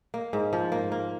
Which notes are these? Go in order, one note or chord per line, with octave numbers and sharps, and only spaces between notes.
A#3
G#2
F3
A#3
A#3